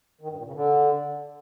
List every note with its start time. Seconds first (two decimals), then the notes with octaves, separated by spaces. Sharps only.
0.21 D#3
0.30 G2
0.38 A#2
0.46 C#3
0.55 D3